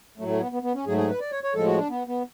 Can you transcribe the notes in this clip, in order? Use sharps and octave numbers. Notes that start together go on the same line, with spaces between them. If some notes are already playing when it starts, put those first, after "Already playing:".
A2 F#3 A3
A3
B3
B3
B3
C#4
G#2 F#3 A3 G#4
G#4
B4
D5
C#5
C#5
A2 F3 G#3 A4
F#4
D4
B3
B3